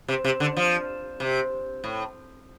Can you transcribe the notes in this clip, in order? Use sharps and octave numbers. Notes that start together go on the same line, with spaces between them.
C3
C3
D3
F3
C3
A2